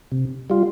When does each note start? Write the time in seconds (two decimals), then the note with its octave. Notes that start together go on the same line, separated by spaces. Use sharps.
0.12 C3
0.50 G3 F4